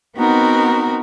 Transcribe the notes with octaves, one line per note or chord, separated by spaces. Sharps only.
B3 C4 D#4 F#4 A#4